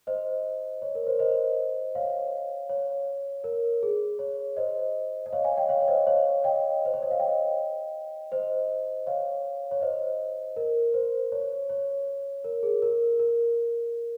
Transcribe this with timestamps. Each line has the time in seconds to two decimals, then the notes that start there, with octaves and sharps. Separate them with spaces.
0.07 C5 D#5
0.82 C#5
0.95 A#4
1.07 C5
1.19 C5 D#5
1.95 C#5 F5
2.69 C#5
3.44 A#4
3.83 G#4
4.19 C#5
4.57 C5 D#5
5.26 D#5
5.33 C#5 F5
5.44 F5 G#5
5.57 D#5 G5
5.69 C#5 F5
5.81 C#5
5.88 C5 D#5
6.07 C#5 F5
6.44 D#5 G5
6.85 C5
6.94 C#5
7.02 D#5
7.11 F5
7.19 D#5 G5
8.32 C5 D#5
9.07 C#5 F5
9.71 C#5
9.81 C5 D#5
10.56 A#4
10.94 C5
11.32 C#5
11.70 C#5
12.44 A#4
12.63 G#4
12.82 A#4
13.19 A#4